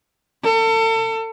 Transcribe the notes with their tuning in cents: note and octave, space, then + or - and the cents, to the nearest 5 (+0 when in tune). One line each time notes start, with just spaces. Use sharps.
A4 +35